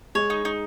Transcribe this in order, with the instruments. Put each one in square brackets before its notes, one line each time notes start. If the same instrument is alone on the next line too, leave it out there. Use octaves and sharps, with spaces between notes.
[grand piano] G#3 [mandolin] C#5
[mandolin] D#4
D#4